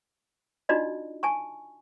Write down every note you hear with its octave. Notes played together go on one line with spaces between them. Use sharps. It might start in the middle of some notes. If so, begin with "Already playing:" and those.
D4 D#4 F4 F#4 D5 D#5
G#5 A5 C#6